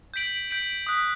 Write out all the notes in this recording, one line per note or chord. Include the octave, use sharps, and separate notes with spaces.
G6 B6 D7 F#7
G6 B6 D7 F#7
D#6 F#6 B6